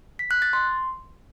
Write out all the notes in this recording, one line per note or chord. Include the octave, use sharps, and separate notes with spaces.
B6
F#6
A6
C6